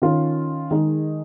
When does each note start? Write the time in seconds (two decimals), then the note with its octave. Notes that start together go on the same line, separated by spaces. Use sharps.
0.02 D#3 C#4 F4
0.71 D#3 G#3 D#4 G#4